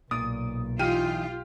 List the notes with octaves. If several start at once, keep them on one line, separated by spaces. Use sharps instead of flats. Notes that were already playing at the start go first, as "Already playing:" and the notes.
B1 A#2 D5 D#6
E3 D#4 F4 G4 F6 D#7